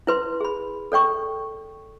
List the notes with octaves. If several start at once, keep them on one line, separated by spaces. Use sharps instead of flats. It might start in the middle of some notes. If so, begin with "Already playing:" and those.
E4 B4 C6
G#4 B5
A4 D5 G5 C#6